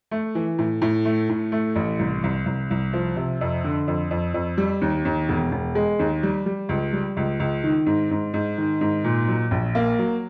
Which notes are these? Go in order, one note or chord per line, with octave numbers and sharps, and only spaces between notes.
A3
E3
A2
A2
A3
A2
A3
A1
C2
C2
C2
C2
F3
C3
F2
D3
F2
F2
F2
G3
D#2
D#2
E1
E1
G#3
D#2
G3
G3
C#2
G3
C#2
C#2
D#3
G#2
G#2
G#2
D#3
G#2
A#2
F#3
A#1
A#3
F#3